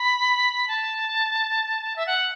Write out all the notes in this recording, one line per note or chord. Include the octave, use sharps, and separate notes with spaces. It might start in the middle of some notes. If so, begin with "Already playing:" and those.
Already playing: B5
A5
E5
F#5